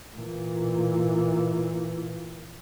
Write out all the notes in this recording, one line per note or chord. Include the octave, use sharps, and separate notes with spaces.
A#2 E3